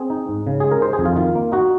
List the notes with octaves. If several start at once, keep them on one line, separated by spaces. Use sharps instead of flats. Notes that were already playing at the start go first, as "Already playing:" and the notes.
Already playing: C4 G#4
D#4
G#2
C#3
G#3 G#4
A#4
D#4 C5
G#4
F2
F4
D#3 F4
A#3
D#4 F#4